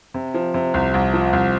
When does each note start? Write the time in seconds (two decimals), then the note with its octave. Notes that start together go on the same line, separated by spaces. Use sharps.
0.14 C3
0.34 F3
0.54 C3
0.74 C2
0.94 C2
1.14 F3
1.33 C2